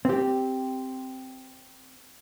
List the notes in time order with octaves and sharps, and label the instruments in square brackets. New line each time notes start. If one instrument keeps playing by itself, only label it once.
[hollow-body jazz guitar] C4 G4